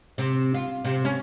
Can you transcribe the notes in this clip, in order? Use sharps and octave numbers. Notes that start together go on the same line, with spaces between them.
C3
F4
C3
C#4